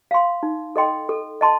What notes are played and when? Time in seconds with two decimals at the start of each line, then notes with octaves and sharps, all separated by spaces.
0.11 F5 C6
0.43 D#4
0.76 A4 D#5 G5 C6
1.09 A4
1.41 D#5 A5 C6